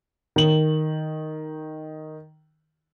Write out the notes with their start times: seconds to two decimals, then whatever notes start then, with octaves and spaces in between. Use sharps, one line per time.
0.36 D#3 F#7